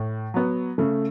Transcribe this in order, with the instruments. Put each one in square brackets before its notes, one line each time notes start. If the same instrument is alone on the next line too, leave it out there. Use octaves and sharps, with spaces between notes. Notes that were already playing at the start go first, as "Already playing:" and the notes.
Already playing: [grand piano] A2
F#3 B3
[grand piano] C#3 [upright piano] A3